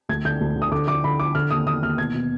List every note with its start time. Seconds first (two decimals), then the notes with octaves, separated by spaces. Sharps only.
0.09 D2 G#6
0.25 D3 G6
0.41 D2
0.56 D3
0.62 D#6
0.71 D3 D6
0.87 D3 D6
1.04 D3 B5
1.19 D3 D6
1.35 D3 F6
1.50 D#2 D#6
1.66 D#2 D#6
1.82 D#2 F6
1.98 B2 G#6
2.14 B2